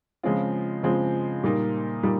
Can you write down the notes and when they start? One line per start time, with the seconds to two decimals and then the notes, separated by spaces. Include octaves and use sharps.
0.23 C#3 F3 G#3 C4 F4
0.83 C#3 F3 G#3 C4 F4
1.44 A#2 G3 A#3 D#4
2.03 A#2 G3 A#3 D#4